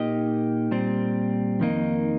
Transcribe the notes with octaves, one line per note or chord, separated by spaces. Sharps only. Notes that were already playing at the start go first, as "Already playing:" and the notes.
Already playing: A#2 A#3 D#4 G4 D#5
A#2 G3 C4
F2 D#3 A#3 D#4